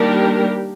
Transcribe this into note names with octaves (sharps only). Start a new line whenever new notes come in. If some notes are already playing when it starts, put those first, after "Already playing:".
Already playing: D#3 G3 A#3 D4 G4 A#4